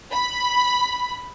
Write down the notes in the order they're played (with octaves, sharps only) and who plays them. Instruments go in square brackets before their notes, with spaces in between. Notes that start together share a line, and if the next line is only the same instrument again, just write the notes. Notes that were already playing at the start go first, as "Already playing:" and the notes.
[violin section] B5